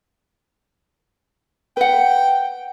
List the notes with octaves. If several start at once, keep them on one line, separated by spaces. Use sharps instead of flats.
B4 F#5 G5